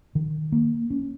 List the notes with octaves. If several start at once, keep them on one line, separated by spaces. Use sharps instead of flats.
D#3
A#3
C#4